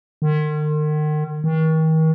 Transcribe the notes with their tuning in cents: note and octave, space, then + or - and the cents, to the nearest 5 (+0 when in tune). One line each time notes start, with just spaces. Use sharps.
D#3 -40
D#3 +40